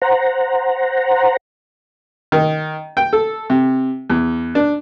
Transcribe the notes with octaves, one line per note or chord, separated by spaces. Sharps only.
C5 F#5 A#5
D#3
G5
A4
C3
E2
D4